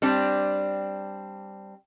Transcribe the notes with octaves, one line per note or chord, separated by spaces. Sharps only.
G3 C4 D4